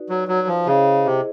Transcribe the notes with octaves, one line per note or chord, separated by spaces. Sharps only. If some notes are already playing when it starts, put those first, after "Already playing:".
Already playing: D#4 F#4 B4 D5
F#3
F#3
F3
C#3 E4 G#4 C5 D#5
C3